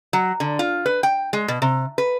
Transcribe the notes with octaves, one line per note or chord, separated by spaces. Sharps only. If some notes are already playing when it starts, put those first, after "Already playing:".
F#3
D3
F4
B4
G5
G#3
B2
C3
B4